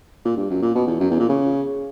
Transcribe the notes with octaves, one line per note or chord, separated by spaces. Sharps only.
A#2
G2
F#2
A#2
B2
E2
F#2
E2
A#2
C#3